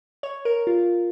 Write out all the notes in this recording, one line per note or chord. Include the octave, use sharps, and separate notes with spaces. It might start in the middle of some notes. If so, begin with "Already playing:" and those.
C#5
A#4
F4